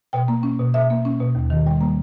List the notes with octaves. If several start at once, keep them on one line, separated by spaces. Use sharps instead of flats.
B2 G5
A#3
C#4
B2
B2 E5
A#3
C#4
B2
D#2
D#3
G3
A#3